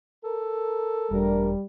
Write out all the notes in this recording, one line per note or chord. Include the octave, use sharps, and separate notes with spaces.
A4 A#4
E1 G3 A3 D4 A#4